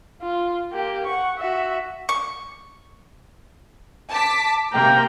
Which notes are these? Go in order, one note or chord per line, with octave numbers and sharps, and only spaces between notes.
F4
A#3 G4
F#5 C#6
F#4 E5
C#6
A5 D6 B6
C3 A#3 G5 A#5